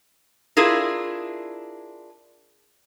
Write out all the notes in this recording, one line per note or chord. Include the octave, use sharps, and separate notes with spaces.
D4 E4 F4 G#4 A#4